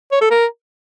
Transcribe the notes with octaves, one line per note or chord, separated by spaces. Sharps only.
C#5
A4
A#4